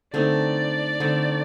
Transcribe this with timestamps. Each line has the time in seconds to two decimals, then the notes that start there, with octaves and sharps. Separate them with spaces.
0.13 D3 A3 C4 D#4 D5
1.00 D3 A3 C4 D#4